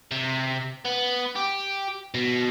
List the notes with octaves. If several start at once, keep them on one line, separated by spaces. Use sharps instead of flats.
C3
B3
G4
B2